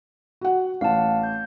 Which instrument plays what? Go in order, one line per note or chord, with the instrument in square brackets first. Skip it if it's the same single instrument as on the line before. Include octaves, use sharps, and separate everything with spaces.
[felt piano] F#4 F#5
[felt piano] A1 [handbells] F5 F#5 A5
[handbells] G6